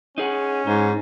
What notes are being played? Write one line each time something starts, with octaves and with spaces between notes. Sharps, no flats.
C#4 D#4 G#4 F#5
G#2 D#4